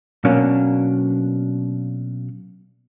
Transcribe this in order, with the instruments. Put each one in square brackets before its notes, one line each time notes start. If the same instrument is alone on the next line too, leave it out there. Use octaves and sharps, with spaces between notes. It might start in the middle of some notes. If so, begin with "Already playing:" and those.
[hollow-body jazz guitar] B2 F#3 A#3 C#4 D4